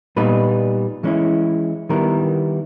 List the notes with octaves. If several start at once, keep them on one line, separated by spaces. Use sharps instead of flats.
A#2 G3 B3 D#4 B4
E3 G#3 C#4 E4
D#3 G3 B3 E4 A#4